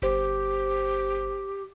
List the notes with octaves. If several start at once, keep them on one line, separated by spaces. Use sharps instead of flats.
G1 G4 C5